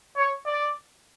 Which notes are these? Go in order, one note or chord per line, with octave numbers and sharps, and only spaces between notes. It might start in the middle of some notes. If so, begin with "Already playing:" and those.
C#5
D5